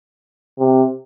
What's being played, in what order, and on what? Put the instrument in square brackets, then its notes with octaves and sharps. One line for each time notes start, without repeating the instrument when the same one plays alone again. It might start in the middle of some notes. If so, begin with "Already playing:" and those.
[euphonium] C3